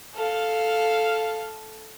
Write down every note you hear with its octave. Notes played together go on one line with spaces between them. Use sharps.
A4 F5